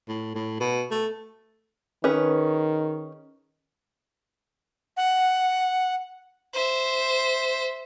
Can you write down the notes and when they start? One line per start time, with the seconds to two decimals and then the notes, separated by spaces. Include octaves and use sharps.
0.08 A2
0.35 A2
0.60 B2
0.91 A3
2.04 D#3 C#4 G#4 B4
4.97 F#5
6.54 C5 E5